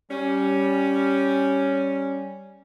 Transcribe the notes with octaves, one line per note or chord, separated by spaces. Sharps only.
G3 C#4